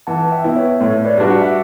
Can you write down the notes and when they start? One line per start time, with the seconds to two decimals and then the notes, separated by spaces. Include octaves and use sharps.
0.07 E3 F#5 A5
0.32 E5 G5
0.44 B3 E4
0.56 C#5 E5
0.80 A2 C#5
1.05 B4 D5
1.18 G3 D4 F#4
1.31 F#5
1.41 E5